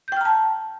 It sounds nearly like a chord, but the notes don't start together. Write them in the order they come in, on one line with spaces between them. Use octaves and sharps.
G6 G5 F6 A#5 A5